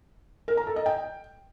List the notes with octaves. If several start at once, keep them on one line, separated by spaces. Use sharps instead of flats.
A#4
A#5
A4
D#5
G5